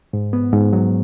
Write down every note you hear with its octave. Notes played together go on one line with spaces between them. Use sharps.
G#2
B3
G#2
F#3